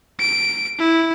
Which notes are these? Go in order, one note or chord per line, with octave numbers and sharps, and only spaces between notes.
D7
E4